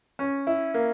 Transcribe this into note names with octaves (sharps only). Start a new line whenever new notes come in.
C#4
E4
A#3